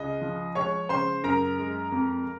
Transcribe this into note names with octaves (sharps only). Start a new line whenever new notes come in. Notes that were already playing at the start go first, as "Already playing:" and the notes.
Already playing: C#2 C#3 D#5
F3
G#3 C#5 C#6
C#3 C5 C6
F#2 A#4 A#5
G#3
F2